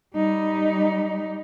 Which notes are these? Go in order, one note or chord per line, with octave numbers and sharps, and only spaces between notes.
G3 D#4